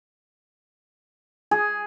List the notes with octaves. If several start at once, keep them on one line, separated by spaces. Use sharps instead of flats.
G#4